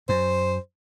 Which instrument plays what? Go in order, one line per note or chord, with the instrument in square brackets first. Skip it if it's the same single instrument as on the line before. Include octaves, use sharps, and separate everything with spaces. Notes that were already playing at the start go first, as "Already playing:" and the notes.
[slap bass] F#2 [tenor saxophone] C5